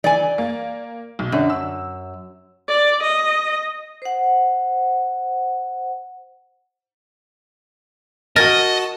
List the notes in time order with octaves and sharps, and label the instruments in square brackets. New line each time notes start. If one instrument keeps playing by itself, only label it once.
[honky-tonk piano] E3 [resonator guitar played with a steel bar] D5 G#5
[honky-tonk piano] A#3
B1
[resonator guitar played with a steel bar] F#2 [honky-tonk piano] D3 D4
[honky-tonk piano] E6
[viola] D5
D#5
[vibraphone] C5 F#5
[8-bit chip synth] F#4 A5 [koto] A#4 G#5 [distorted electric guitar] D#5 [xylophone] F6 A6 A#6